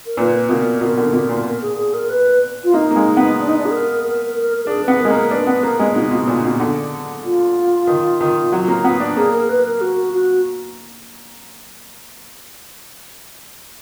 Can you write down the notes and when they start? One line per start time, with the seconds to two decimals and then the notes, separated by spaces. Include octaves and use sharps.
0.06 A#4
0.17 A#2 B4
0.49 B2 A#4
0.81 B2 A#4
0.97 D3
1.13 B2
1.29 A#2
1.46 A#4
1.62 G#4
1.78 G#4
1.94 A#4
2.09 B4
2.64 F4
2.74 A#3 D#4
2.91 A#3
2.96 G#3
3.17 B3
3.38 D4
3.48 D#4
3.57 D4
3.65 G#4
3.71 A#4
4.03 A#4
4.35 A#4
4.56 A#4
4.67 D4 G#4
4.83 B3 B4
4.99 A#4
5.05 G#3
5.10 A#3 A#4
5.31 D4 B4
5.47 B3
5.63 A#3 A#4
5.79 G#3 B3
5.88 D4
5.95 B2 D#4
6.11 B2 B3
6.27 A#2 D4
6.44 B2
6.60 D3
7.24 F4
7.87 D#3
8.21 D#3
8.52 F#3
8.68 A#3
8.84 B3
9.00 D4
9.17 A#3 G#4
9.33 A#4
9.49 B4
9.64 A#4
9.81 F#4
10.13 F#4